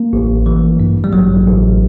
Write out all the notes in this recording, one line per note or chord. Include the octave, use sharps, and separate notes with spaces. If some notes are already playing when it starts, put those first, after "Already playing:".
Already playing: A#3
A1
E3
G2
G3
A1 F#3
A1